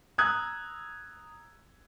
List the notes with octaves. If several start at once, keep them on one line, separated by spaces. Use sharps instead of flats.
A#5 D#6 E6 F#6 G#6